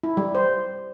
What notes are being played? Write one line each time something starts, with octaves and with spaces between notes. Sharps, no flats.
E4
G3
C5